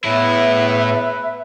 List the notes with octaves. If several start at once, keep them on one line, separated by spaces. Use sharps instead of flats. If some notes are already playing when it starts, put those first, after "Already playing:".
A2 C#3 E3 B3 E4 B4 E5